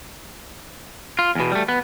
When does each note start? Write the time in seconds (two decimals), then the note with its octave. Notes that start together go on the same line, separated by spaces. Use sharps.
1.19 F4
1.35 E2 B2
1.51 G3 A3
1.68 B3